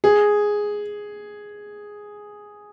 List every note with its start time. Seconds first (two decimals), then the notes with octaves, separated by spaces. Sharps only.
0.04 G#4